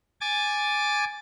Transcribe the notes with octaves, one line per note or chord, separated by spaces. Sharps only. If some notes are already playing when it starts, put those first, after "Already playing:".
G#5 D6 A6